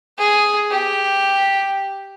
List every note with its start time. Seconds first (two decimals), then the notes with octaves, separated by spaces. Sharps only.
0.18 G#4
0.71 G4